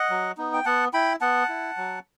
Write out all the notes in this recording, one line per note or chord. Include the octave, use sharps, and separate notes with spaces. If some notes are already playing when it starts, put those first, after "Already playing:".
Already playing: D#5 F#5
F#3
B3 D#4
G5
B3 F#5 A5
E4 G5 B5
B3 F#5 A5
E4
F#3